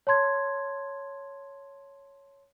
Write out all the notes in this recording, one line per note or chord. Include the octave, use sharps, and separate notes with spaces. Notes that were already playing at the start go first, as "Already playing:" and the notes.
C#5 A5 C6 G#6